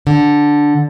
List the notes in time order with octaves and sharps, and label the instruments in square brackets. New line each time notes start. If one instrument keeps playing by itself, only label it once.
[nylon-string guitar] D3